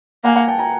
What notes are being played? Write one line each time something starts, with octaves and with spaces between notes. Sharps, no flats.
A#3 F#5 G#5
F#5 G#5
G5 A5
G#5 A#5